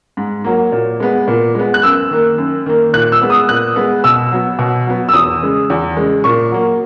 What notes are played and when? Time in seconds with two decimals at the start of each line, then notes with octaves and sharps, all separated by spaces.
0.17 G#2
0.44 F#3 A#3
0.72 A#2
1.00 G#3 B3
1.28 A#2
1.55 G#3 B3
1.74 F#6
1.83 F#2 E6
2.11 D#3 A#3
2.38 F#2
2.66 D#3 A#3
2.93 A#2 F#6
3.12 E6
3.21 G#3 B3
3.30 D#6
3.49 A#2 F#6
3.76 G#3 B3
4.04 B2 E6
4.32 F#3 B3
4.59 B2
4.87 F#3 B3
5.09 E6
5.14 E2 D#6
5.42 C#3 G#3
5.70 E2
5.97 C#3 G#3
6.24 A#2 C#6
6.52 F#3 A#3